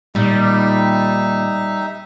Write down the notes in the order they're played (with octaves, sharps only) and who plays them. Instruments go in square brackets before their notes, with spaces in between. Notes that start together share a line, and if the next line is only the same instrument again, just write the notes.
[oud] D#2 A#2 [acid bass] G3 [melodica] D#4 E5